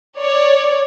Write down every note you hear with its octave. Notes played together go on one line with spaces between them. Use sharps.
C#5 D5